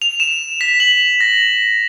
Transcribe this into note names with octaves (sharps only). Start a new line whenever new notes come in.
F7
E7
B6
F#7
A#6